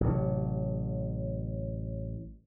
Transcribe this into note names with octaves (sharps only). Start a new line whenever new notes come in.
A1 C3 F#3